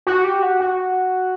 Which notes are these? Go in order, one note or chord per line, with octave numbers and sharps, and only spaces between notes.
F#4
G4
F#4
F#4